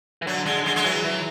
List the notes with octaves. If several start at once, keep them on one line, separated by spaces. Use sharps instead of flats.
E3
D3 F#3
D3 G#3
D3 G#3
G#3
E3 F#3
E3